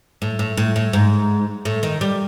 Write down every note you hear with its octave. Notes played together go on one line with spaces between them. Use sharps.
A2
A2
A2
A2
G#2
A2
D#3
G3